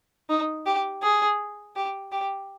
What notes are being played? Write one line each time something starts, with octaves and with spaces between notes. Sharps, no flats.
D#4
G4
G#4
G4
G4